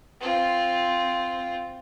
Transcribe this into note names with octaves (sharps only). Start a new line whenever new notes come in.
C4 F4